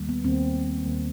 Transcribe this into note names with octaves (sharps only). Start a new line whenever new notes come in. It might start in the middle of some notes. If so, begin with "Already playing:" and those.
Already playing: D#2 D#3 G3 A#3
B3
D#2 D#3 G3 A#3 C4
D#2 D#3 G3 A#3